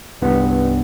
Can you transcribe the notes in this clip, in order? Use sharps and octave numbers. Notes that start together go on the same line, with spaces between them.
C2 G2 B3